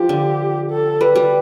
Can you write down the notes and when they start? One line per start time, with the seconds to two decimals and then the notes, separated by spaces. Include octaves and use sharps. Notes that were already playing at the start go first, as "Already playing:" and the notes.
Already playing: F3 G4
0.09 D3
0.70 A4
1.01 G3 B4
1.16 G3